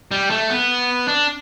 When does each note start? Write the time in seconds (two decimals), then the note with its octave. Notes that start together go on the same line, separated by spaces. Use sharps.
0.11 G3
0.30 A3
0.50 B3
1.08 D4